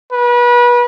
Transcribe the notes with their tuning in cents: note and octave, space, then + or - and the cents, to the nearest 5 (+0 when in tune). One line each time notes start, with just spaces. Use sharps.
B4 -30